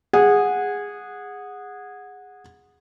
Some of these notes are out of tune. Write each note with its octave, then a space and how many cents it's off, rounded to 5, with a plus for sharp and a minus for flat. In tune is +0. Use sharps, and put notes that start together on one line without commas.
G#4 -15 F#5 -15